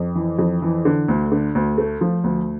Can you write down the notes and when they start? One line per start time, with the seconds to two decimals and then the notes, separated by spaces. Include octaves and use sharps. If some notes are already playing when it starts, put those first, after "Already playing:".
Already playing: F2
0.15 E3
0.39 F2
0.62 E3
0.85 D3
1.08 D2
1.32 D3
1.55 D2
1.78 A3
2.01 F3
2.24 D2